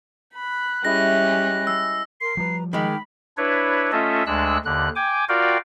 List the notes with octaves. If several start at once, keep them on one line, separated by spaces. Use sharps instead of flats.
B5 F#6
G3 G#3 C#4 E4 G4 D#6 A#6
E6
A#4 C6 C7
F3 G3 B4 A#5
D#3 G#3 G5 B5 D6 F6
D4 E4 B4 C#5
A3 C#4 F4 A4 D#5 E5
D2 G#3 D4 E6 F#6
D#2 D3 F#6
G5 G#5 D6
F4 F#4 A#4 D5 F5 G5